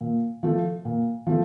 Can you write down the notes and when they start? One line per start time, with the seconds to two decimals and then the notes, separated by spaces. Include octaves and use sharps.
0.01 A#2
0.43 F3 A3
0.85 A#2
1.27 F3 A3